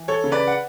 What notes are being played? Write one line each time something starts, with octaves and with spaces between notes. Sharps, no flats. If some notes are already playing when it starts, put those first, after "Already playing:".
Already playing: E3
A4 C#5
C#3
B4 D5
F#5